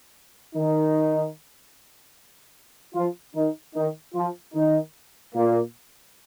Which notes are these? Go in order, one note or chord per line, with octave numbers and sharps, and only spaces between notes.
D#3 D#4
F3 F4
D#3 D#4
D#3 D#4
F3 F4
D#3 D#4
A#2 A#3